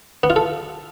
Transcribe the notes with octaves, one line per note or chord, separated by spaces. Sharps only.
B3
F4
A4